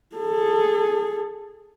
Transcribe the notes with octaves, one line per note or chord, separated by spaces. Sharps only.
G#4 A4